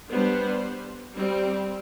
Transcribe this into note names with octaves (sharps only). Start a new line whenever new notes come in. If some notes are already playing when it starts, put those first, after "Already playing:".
G3 B3 D4 C5
G3 C4